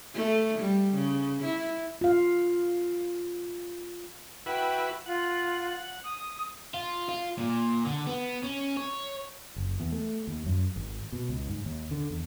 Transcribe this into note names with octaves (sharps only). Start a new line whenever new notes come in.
A3
G3
C#3
E4
F4 F5
E4 F#4 B4 G5
F4 F#5
D#6
F4
F4
A#2
D3
B3
C#4
C#5
F#1
E2
A3
D#2
F#2
G#1
B2
C#2
G#2
D#2
D3
E2